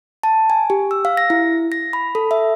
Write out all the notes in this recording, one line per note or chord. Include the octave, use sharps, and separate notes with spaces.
A5
G#5
G4
E6
F5
A#6
E4
A#6
B5
A4
E5